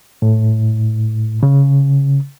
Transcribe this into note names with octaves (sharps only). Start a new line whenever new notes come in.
A2
C#3